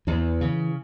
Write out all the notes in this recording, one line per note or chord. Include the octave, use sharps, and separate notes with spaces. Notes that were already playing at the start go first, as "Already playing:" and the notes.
E2 E3
C#3